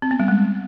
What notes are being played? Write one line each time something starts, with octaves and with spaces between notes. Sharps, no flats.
C4
B3
G3
G#3